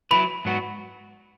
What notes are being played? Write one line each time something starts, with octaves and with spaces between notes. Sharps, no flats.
F#3 A3 E4 B4 B5
G#2 F#3 B3 F#4